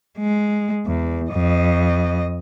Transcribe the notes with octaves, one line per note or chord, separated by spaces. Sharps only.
G#3
E2
F2 D#5